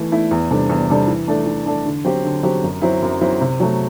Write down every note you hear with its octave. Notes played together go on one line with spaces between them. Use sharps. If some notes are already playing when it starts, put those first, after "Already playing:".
Already playing: E3 A3 E4
A3 E4
E2
C3 G3 D4 A4
E2
C3 G3 D4 A4
E3
A3 D4 A4
E3
A3 D4 A4
D3
F#3 C4 G4
D3
F#3 C4 G4
F#2
F#3 C4 E4
F#2
F#3 C4 E4
C3
F#3 A3